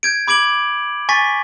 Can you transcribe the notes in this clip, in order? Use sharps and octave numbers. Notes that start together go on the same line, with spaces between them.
G6 G#6 D7
B5 D6 G#6 D7 F#7
G#5 C#6 A6 B6